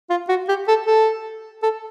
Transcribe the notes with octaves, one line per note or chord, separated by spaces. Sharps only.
F4
F#4
G4
A4
A4
A4